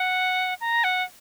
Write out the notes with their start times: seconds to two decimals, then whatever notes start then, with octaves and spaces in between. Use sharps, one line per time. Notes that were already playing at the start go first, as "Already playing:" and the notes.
Already playing: F#5
0.61 A#5
0.84 F#5